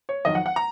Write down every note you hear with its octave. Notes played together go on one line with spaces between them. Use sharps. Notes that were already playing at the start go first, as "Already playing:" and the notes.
C#5
F2 D#3 F#3 D#5
F#5
F#5
A#5